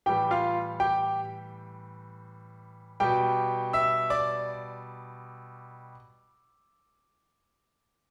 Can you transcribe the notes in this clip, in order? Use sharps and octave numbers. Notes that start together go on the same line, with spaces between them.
A2 E3 G3 G4 G5
F4 F5
G4 G5
B2 G3 G4 G5
E5 E6
D5 D6